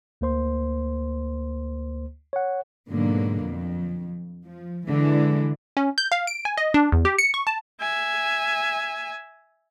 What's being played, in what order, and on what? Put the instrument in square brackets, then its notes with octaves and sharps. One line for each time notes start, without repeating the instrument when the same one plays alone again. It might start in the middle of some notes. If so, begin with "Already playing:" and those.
[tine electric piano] D2 A#3 C5 C6
C#5 F#5
[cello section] G#2 B2 D3 F#3 A#3
F2
F3
D3 E3 G#3
[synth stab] C#4
G6
F5
D7
G#5
D#5
D4
E2
G4
C#7
C#6
A5
[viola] E5 G#5